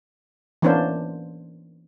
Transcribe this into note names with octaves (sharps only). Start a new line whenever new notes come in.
E3 A#3 B3 C#4 D4 C5